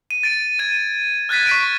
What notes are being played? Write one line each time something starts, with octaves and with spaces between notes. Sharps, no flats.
D#7
A6 D7
G#6 D#7
F6 F#6 G#6 A6 B6 D#7
C#6 B6 D7